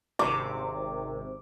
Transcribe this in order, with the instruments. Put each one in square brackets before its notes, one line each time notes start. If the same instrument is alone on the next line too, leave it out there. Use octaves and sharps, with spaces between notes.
[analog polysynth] G#1 C3 [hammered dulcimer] D6